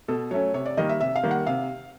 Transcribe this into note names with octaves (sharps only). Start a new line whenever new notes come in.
B2 A4
F#3 A3 C#4 C#5
C3 C#5
D5
D#3 G3 A#3 D#5
E5
C3 E5
F5
D#3 G3 A#3
F#5
C3 F5